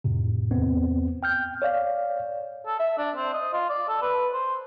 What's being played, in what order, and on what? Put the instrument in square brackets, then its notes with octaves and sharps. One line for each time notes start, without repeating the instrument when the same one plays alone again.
[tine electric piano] F2 A2 C3
E2 B3 C4
G5 F6 G6
C#5 D5 F5
[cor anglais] A4
E5
D4
C4
D#5
F4
D5
A4
B4
C5